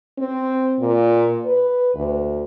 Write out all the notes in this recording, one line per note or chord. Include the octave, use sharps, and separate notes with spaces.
C4
A#2
B4
D2